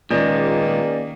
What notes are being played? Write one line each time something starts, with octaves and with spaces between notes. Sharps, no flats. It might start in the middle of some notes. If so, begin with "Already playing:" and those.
C#2 A#2 D#3 G#3 A#3 C#4 D5 D#5